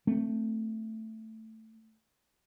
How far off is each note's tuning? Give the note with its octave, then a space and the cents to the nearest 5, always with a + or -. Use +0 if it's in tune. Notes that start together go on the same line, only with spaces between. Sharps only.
A3 +10 C4 +0